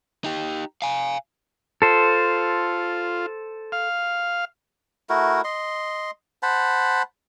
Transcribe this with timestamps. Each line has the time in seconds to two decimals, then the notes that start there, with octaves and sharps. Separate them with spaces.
0.24 D#4 G4
0.82 F5 G#5
1.82 F4 A4 C5
3.72 F5
5.10 A3 E4 F#4 A#4
5.44 D#5 C6
6.43 C5 F#5 A5 B5